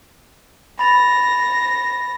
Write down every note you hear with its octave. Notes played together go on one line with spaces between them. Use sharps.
B5 A6 A#6 F7